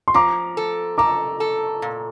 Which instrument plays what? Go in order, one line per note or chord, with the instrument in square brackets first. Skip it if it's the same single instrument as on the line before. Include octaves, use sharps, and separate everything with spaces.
[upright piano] C6
[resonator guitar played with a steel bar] F3 [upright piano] A#5 D6
[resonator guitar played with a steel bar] A4
[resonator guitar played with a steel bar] A4 [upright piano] A#5 D6
[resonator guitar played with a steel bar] A4
A#2